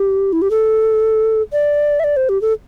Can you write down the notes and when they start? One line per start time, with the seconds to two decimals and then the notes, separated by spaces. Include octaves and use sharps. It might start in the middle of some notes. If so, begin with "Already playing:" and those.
Already playing: G4
0.32 E4
0.42 G4
0.50 A4
1.52 D5
1.99 E5
2.04 D5
2.16 C5
2.29 G4
2.41 A4